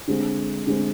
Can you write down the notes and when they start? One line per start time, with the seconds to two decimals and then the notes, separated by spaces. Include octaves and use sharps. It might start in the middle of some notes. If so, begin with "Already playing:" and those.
0.08 D3 G#3 C4
0.67 D3 G#3 C4